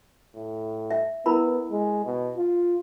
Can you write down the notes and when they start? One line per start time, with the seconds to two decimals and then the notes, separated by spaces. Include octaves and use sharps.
0.35 A2
0.91 E5
1.26 B3 E4 A#4 B5
1.71 G#3
2.06 B2
2.37 F4